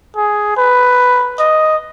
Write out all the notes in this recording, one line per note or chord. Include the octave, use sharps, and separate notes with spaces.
G#4
B4
D#5